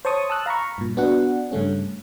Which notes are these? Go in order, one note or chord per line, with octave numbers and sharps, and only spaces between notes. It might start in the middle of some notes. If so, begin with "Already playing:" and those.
C5 C#5 A5 C#6 D#6
A5 E6 F#6
F5 A#5 B5 C#6
G2 A#2
B3 D4 F#4 F#5
G2 C#3 A3 C#4